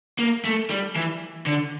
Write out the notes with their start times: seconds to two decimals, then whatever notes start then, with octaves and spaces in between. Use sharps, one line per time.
0.19 A#3
0.45 A3
0.70 G3
0.96 E3
1.47 D3